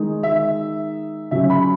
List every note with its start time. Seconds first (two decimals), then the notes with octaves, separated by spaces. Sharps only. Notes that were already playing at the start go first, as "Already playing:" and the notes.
Already playing: D#3 G#3 D#4
0.23 E5
1.31 C#3 F#3 C#4 E5
1.50 B5